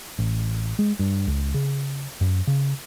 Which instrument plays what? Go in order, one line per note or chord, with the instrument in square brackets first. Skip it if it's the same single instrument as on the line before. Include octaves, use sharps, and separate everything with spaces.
[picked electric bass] A1
G#3
G2
C#2
C#3
F#2
C#3